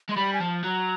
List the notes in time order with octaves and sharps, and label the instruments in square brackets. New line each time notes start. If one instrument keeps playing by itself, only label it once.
[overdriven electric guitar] G#3
[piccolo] C6
[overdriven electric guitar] G3 [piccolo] B5
[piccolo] G#5
[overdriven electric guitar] F3 [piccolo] A5
[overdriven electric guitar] F#3 [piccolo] A#5